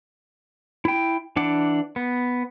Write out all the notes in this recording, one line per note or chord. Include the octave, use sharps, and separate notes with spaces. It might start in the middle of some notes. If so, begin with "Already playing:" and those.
E4 G5
E3 D4 F#5 D6
B3